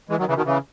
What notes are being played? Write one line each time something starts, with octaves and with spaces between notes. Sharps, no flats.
E3 G#3
D#3 F#3
C#3 E3
B2 D#3
C#3 E3